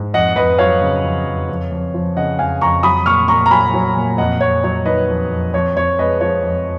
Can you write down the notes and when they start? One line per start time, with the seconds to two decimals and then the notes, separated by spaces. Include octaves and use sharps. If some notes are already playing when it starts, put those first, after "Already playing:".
Already playing: G#2
0.14 F2 D#5 F#5
0.36 F2 B4 D#5
0.58 F#3 C#5 F5
0.82 C#3
1.04 F2
1.26 F2
1.49 F2
1.71 F2
1.94 F3
2.17 C#3 D#5 F#5
2.39 F2 F5 G#5
2.61 F2 A#5 C#6
2.83 F#3 B5 D#6
3.06 A#2 C#6 F6
3.28 A#2 A#5 C#6
3.46 A#5
3.51 F#3 G#5 B5
3.74 F#3
3.97 A#2
4.18 F2 D#5 F#5
4.41 F2 C#5
4.64 F#3 C#5
4.86 D#3 B4 D#5
5.09 F2
5.31 F2
5.54 F2 C#5
5.76 F2 C#5
5.99 G#3 B4 D#5
6.21 F3 C#5
6.43 F2